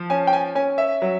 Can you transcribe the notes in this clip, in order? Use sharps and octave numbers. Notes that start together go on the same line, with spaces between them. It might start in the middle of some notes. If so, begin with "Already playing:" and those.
Already playing: F3
C#4 G#5
G5
G#5
C#4 G#5
E5
F#3